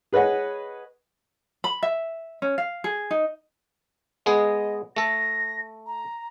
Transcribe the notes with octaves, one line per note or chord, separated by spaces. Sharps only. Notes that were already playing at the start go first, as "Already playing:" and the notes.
G#4 B4 C#5 D#5 F#5
B5
E5
C#4
F5
G#4
D#4
G#3 B3 G#4 D#5
A3 A4 A#6
A#5